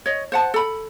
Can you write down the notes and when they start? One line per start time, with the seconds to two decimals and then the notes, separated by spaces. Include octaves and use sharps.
0.06 C#5 D#5
0.32 C5 F#5 A5
0.54 A4 B5